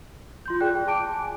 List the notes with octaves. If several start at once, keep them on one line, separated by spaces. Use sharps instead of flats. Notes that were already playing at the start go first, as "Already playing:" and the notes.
F4 C6 G6
G#4 D5 G5 F#6
A5 D6 D7
G#5